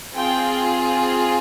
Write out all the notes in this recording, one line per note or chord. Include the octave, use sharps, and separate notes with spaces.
C4 F4 G#4 G5